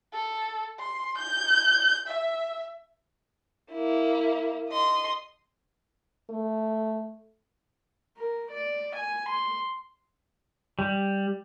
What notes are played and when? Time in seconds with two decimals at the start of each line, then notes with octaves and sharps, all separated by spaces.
0.13 A4
0.80 C6
1.18 G6
2.07 E5
3.72 A#3 E4
4.69 D#5 C6
6.30 A3
8.17 A#4
8.51 D5
8.95 G#5
9.29 C6
10.79 G3